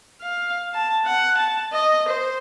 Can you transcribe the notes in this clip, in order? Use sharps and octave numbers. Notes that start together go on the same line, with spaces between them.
F5
A5
F#5
A5
D#5
C5